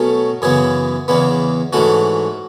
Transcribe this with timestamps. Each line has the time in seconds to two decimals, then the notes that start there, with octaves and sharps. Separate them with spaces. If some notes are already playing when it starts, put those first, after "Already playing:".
Already playing: B2 F#3 A3 C#4
0.42 F#2 C#3 E3 B3 G#4
1.08 E2 C#3 E3 B3
1.73 G#2 E3 A3 C#4 F#4